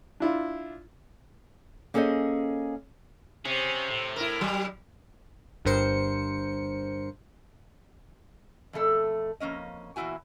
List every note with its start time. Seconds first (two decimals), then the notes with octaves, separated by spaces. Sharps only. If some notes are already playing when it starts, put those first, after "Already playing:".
0.20 D4 E4 F4
1.94 A#3 C#4 G#4 A4 C5 D#5
3.45 C3 C#4 G#4
3.90 A2
4.16 E4 A#4
4.41 F#3 G3
5.65 G1 G2 A#4 C5 C#7
8.73 F2 B2 A3 A4
9.40 F2 A#3 C#4 D#5
9.96 E2 A#2 F3 E4 F#4 G#5